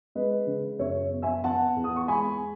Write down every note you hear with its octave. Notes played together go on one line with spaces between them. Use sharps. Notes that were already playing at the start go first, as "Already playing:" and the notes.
G#3 B4 D#5
C#3
F#2 C#5 E5
B3
E5 G#5
B3 F#5 A5
E2
D#6
C#6
G#3 G#5 B5